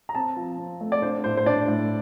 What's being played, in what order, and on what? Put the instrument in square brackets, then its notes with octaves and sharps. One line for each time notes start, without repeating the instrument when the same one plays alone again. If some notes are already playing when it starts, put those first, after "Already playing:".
[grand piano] A#5
C4 A5
F3
C4
A3
D5
D4 C5
A2 C5
C5
D4 D5
A2